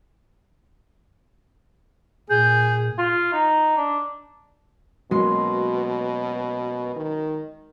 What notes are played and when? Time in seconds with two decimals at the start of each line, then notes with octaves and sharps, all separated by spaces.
2.30 A#2 G#4 G6
2.98 F4
3.33 D#4
3.77 D4
5.11 B2 F#3 G#3 A#3 C#4 C6 C7
6.96 D#3